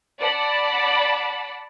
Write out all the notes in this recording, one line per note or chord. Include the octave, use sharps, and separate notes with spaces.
D5 F#5 A5 B5